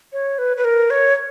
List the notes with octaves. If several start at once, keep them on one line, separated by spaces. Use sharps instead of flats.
C#5
B4
B4
A#4
C#5